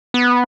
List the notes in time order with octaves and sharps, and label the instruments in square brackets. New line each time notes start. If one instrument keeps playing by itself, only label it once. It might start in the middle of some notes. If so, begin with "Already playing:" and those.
[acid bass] B3